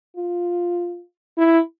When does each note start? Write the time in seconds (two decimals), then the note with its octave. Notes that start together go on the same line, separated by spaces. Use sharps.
0.17 F4
1.38 E4